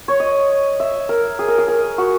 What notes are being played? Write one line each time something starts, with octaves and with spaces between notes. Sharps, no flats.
C#5
D#5
E5
A#4
G#4
A#4
G#4
A#4
F#4